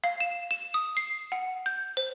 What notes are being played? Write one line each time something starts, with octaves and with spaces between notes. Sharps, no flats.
F5
E7
E7
D#6
C7
F#5
G6
C5